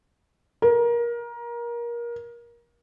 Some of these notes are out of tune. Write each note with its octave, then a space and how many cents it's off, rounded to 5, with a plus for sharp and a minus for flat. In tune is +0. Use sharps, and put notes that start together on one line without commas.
A#4 +25